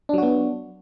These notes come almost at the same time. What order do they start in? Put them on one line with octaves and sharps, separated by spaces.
D4 F#3 F#4 B3